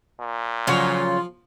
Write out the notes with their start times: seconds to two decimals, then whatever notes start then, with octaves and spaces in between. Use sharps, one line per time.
0.21 A#2
0.67 C#3 F3 F#3 F4 C#5